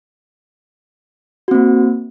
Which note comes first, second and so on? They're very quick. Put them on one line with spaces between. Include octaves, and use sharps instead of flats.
F#4 C4 A#3